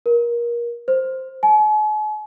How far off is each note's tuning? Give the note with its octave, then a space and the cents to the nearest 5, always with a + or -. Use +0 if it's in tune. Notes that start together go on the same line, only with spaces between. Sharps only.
A#4 +25
C5 +0
G#5 +45